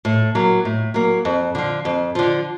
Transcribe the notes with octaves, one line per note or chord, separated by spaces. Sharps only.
A2
F#3 A#3
A2
F#3 A#3
F2
D3 F3
F2
D3 F3